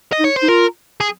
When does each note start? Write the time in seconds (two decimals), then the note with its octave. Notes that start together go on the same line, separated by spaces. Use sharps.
0.13 D#5
0.20 D#4
0.25 C#5
0.37 C5
0.43 D#4
0.48 F4 A#4
1.01 G#4